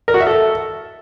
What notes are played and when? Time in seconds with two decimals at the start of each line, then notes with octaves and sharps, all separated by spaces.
0.08 A#4
0.14 F#4
0.20 E5
0.27 A4